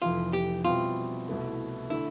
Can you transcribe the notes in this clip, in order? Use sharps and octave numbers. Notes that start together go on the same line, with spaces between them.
F1 F2 E3 F4
G4
B2 G3 C4 E4 F4
C2 B2 A3 E4
D3 A3 E4